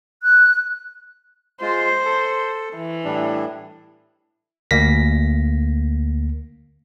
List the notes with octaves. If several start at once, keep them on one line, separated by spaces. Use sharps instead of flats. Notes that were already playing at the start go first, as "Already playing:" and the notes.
F#6
G#3 F4 C5
A4
E3
A2 G3 D4
D2 A#3 A#6 B6